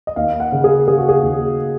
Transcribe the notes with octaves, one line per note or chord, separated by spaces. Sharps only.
D#5
D#2 F5
F#5
C#3
G#4
C#3 G#4
F#4
G#4
D#2